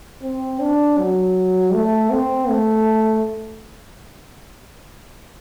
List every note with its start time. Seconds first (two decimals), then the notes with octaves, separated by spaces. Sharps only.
0.22 C4
0.60 D4
0.98 F#3
1.74 A3
2.11 C4
2.49 A3